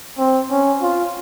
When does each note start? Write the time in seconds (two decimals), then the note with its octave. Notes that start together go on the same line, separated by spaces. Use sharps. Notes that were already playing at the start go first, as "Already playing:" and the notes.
0.18 C4
0.51 C#4
0.82 F4